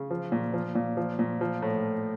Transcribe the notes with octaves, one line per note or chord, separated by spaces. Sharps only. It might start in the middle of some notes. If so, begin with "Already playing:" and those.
Already playing: C#3
F3
A#2
F3
A#2
F3
A#2
F3
A2